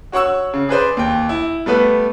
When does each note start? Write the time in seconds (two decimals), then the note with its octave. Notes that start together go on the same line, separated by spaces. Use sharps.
0.12 F#4 C#5 F#5 C#6 E6
0.54 C#3
0.69 G#4 B4 C5 D5
0.97 D#2 G5
1.29 E4
1.66 G3 A3 B3 B4